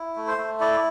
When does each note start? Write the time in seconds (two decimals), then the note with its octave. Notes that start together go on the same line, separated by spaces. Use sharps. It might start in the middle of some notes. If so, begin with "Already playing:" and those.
Already playing: E4
0.16 A3
0.27 C5
0.38 A3
0.60 E4 D5